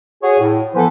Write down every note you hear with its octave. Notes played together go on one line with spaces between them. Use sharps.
F#4 G#4 C#5
A2
E3 F3 B3 A4 B4 C5